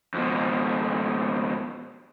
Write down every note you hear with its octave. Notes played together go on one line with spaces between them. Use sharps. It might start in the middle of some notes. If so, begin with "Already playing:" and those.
F2 B2